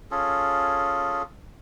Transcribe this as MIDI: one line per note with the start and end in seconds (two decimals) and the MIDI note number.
0.11 1.22 61
0.11 1.22 65
0.11 1.22 68
0.11 1.22 69